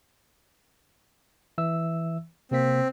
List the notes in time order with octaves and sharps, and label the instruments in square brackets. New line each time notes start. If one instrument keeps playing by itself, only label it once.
[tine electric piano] E3 E5 E6
[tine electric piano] C3 A#3 B6 [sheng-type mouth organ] C4